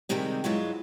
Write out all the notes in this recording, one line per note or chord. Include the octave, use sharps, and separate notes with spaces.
C3 D#3 G3 G#3 C4
G2 E3 F#3 G#3 F4 F#4